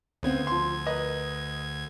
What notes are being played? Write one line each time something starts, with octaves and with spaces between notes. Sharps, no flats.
D2 C#3 B3 C4 G#6
F3 C6
A#4 B4 D#5